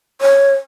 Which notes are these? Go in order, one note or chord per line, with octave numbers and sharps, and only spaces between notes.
C#5